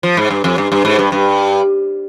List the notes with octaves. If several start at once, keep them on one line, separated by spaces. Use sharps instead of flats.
F3
G#2
G2
F2
G2
G2
G#2
G2
G2